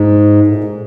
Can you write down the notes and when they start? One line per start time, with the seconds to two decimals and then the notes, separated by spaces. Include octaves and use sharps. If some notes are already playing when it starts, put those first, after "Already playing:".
Already playing: G#2
0.47 A2
0.55 A#2
0.64 A2